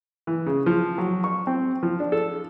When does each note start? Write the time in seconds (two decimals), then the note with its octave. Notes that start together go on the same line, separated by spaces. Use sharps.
0.27 E3
0.46 C#3
0.66 F3
0.98 F#3
1.24 C#6
1.47 C4
1.83 F3
2.00 D4
2.12 A4